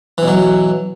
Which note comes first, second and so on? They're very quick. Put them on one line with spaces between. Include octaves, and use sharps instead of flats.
E3 B2 F#3